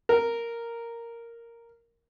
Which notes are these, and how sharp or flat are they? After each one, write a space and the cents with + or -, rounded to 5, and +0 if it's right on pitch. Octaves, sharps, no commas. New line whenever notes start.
A#4 -5